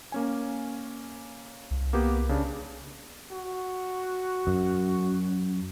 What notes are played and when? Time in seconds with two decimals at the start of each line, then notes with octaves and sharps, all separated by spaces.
0.12 A#3 C#4 G#5
1.71 C2
1.93 A#3 B3 G4
2.29 C#3 D4
3.31 F#4
4.47 F#2